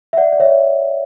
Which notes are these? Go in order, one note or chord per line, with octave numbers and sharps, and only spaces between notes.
E5
D5 F#5
D5
C#5 E5